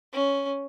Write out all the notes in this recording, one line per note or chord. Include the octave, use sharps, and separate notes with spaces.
C#4